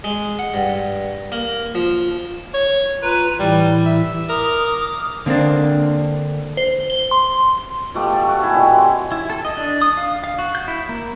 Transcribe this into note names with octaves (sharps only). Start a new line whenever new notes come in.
G#3
F#5
G2
A#3
F3
C#5
F4 B4 A#5
A2 E3 G3 E4
E5
A#4 D6 D#6
D3 A#3 C4 D4
C5
G7
C6
B2 F3 A3 G4
A5
F#4
E4 G4 G#4
A#2 C4 D#5
F#3 C6
E4
A4
D#5
D4
D#6
F5
F5
F#4
G6
E4
A#3